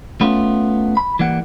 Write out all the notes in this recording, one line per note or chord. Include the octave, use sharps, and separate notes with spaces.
A3 B3 C#4 F4
B5
E3 G3 A#3 F#5